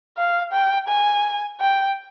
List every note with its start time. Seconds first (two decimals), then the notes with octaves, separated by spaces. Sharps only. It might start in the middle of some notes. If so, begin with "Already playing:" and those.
0.17 F5
0.52 G5
0.88 G#5
1.61 G5